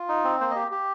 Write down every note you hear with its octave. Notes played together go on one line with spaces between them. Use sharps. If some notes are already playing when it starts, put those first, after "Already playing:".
Already playing: F4
D#4
C4
A#3 C5
D#5
G4
G4